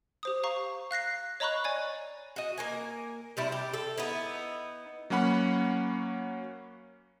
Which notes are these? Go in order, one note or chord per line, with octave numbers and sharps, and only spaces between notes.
G4 C5 D#6
F5 A#5 C#6
F5 F#6 A#6 C7
C#5 D#5 A#5 B5 C#6 F#6
C#5 D5 G#5
F#4 D#5
A#3 A#4 G#5
C3 G3 E4
G4
A4
B3 D#4 E4
F#3 A#3 C#4 F#5 B5